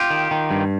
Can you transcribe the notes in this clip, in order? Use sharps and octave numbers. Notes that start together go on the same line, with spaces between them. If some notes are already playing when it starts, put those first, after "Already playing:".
Already playing: F4 G4
D#3
D#3
G2